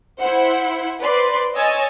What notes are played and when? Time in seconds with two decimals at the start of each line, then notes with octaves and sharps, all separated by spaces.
0.21 E4 C5 F#5
1.01 B4 C5 D5 C6
1.55 C#5 D#5 G#5 E6 G#6 A6